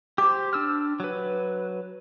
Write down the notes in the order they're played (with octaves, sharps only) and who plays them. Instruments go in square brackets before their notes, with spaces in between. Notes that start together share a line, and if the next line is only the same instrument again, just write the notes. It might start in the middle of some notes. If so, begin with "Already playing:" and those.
[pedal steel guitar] G4 C5 [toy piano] D6
[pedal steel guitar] D4 E6 F6
F#3 B4